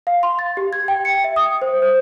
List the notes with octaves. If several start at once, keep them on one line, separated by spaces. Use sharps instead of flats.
F5
C6
A6
G4
G#6
G5
C#7
E5
D#6
C5
C5